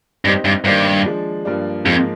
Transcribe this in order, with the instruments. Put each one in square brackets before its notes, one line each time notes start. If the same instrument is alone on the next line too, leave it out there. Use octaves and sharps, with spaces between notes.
[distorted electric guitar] G2 [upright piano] G3 C4 D#4 G4 C5
[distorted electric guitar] G2
[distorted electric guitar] G2 [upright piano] D#3 A#3 D4 G4 C5
[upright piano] F3 G#3 D4
G2 F3 A#3 D4
[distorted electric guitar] F2 [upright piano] G#2 F3 A#3